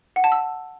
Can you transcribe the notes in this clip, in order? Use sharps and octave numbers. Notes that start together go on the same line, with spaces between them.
F#5
A5
E6